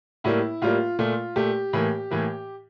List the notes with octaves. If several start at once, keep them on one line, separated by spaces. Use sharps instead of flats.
A2 G3 A#3 E4
A2 G3 A#3 F4
A#2 A3 F4
A#2 A3 G4
A2 E3 A#3
A2 E3 A#3